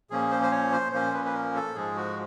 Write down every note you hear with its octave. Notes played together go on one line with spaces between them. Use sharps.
A#2 F3 A#3 C#4 G#4
C5
C5
C#5
C5
A#2 F3 A#3 C#4 C5
B4
B4
A#4
A4
G#2 F3 G#3 G#4
F#4